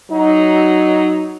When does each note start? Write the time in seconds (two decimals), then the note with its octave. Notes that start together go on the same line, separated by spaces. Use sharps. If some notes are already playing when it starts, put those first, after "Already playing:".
0.11 F#3 D#4